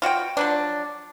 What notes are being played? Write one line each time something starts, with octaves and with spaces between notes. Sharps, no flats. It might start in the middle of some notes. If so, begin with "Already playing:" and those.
F4 F#4 F#5 G5
F3 F#3 D4